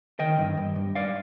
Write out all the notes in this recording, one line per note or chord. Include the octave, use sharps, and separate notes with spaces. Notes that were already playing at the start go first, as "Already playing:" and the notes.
D#3 D#5 G5
G2
G2
G2
G2 D5 F5